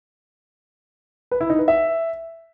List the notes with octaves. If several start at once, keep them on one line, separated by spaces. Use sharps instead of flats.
B4
E4
D#4
B4
E5